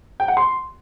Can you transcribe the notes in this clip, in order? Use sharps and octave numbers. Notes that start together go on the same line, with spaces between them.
G5
F#5
C6